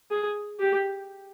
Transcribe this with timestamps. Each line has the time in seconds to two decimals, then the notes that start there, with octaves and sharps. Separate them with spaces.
0.11 G#4
0.59 G4